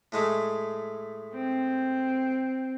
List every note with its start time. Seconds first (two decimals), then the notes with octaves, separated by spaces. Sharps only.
0.12 A2 G#3 A3
1.34 C4